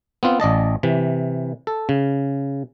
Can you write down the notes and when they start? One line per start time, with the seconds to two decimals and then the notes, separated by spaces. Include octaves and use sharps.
0.23 B3 C4 F4
0.40 A1 D5 D#5 A5
0.83 C3 E3
1.67 A4
1.89 C#3